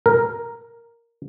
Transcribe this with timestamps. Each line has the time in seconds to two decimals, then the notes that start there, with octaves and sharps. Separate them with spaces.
0.06 A#4